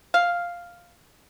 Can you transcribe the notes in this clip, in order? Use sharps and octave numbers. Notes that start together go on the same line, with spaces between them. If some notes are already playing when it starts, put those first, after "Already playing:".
F5